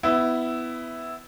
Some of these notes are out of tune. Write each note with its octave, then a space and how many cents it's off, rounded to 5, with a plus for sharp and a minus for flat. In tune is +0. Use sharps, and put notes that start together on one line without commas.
B3 +20 E4 -5